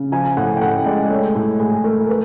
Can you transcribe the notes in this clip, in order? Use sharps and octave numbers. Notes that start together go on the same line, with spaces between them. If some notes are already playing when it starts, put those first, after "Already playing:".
Already playing: C#3
F3 G#5
A2 F#5
G5
A2 F#5
G#3 D5
A3 C#5
A2
A2 G#4
A3 A#4
B4